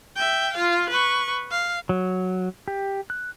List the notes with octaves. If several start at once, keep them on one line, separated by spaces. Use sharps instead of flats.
E5 G5
F4 F5
B4 C#6
F5
F#3
G4
F#6